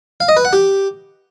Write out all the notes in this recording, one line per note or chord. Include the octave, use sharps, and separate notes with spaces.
F5
D#5
B4
F#5
G4